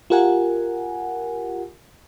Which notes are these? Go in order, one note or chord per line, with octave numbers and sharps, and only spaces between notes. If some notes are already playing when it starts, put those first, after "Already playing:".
F4 G4 A#4 F#5 G#5